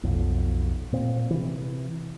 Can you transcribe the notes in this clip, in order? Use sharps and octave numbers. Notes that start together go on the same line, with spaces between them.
B1 F2
A#2 C4
C3 E3